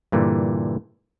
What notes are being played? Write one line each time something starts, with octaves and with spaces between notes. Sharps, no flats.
G2 A#2 D3 E3